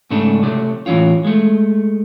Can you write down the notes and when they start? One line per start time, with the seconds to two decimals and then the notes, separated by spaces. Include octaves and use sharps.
0.11 G#2 C#3 A3 D4
0.42 C3 F#3 A3
0.86 A2 E3 F#3 C#4 F4
1.25 G#3 A3